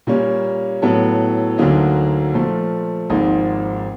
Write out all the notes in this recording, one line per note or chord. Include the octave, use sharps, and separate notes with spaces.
A#2 G3 A#3 C#4
A2 F#3 B3 E4 A4
D2 D3 F#3 A#3 D#4
A#2 F3 A3
G#1 G#2 F3 A#3 D#4